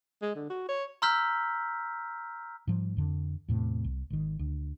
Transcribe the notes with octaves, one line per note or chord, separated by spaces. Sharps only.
G#3
D3
F#4
C#5
A#5 C6 E6 F6 G6 B6
G#2 F3 G3
F2 D3
E2 A2 C3
C2
G#1 D#3
D2